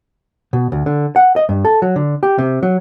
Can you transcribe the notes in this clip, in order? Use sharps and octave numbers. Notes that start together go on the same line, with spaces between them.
B2
D2
D3
F#5
D#5
G2
A4
F#3
D3
G4
C3
F#3